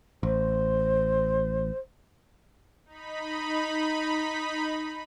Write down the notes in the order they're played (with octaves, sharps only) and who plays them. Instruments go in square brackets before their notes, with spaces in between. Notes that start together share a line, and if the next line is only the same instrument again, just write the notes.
[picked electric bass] A1 [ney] C5
[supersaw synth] D#4 B5